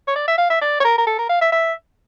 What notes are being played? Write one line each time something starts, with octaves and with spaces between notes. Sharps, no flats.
C#5
D5
E5
F5
E5
D5
C#5
A#4
A#4
A4
A#4
F5
E5
E5